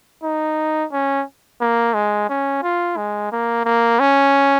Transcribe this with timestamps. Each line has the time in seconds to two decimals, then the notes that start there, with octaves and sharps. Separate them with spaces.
0.23 D#4
0.92 C#4
1.61 A#3
1.94 G#3
2.29 C#4
2.63 F4
2.97 G#3
3.32 A#3
3.65 A#3
4.00 C#4